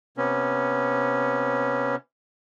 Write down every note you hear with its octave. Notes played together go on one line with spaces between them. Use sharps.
C3 B3 C#4